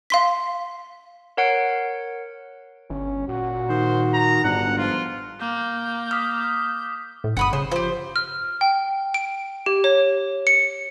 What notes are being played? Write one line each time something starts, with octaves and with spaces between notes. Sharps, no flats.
F5 C6 B6
A#4 C#5 F#5 C7 D7
G1 C#4
A#2 F#4
D#3 C5
A#5
G1 G#2 D4 F#5
F3 F4
A#3 G6
D6 D#6 F6 B6
A2
G1 F#5 B5 D#6
C#3 C5
F3 G4 C5
F6
G5
D7
G4
C#5
C#7